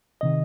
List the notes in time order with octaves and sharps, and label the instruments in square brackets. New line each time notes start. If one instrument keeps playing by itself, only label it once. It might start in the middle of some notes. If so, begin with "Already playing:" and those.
[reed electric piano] C3 D#3 D#5